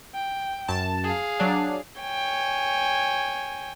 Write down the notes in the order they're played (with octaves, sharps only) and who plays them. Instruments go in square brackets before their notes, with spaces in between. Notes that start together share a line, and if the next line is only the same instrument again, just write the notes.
[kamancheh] G5
[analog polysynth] F#2 A5
[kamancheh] G#4 F5
[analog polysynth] F#3 D4
[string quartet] C#5 G5 G#5